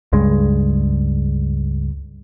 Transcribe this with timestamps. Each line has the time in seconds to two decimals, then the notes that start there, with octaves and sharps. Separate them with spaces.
0.13 C#2 G2 G#3